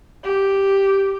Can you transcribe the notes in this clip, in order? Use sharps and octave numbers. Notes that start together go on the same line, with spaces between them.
G4